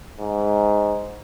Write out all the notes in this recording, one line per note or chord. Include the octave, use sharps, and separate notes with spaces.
G#2